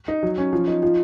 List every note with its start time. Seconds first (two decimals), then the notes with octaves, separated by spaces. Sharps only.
0.08 D#4
0.23 F#3
0.38 C#4
0.53 F3
0.67 D#4
0.83 F3